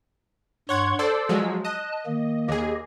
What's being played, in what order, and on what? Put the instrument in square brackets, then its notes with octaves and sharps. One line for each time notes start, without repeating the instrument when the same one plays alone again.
[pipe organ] G2 C6 C#6 [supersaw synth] C#5 F#5 G#6
[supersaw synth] A4 C5 D5 [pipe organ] E6
[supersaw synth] F3 F#3 G#3
[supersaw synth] D#5 [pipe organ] A5 F#6
[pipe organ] D#3 A#3
[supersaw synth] D#2 G#4 [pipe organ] G4 D#5